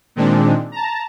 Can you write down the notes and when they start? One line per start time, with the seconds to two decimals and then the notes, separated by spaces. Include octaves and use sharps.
0.16 A#2 D#3 G#3 C4 D4
0.72 A5 A#5